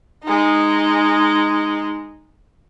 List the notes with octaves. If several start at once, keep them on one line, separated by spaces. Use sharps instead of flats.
G#3 D#4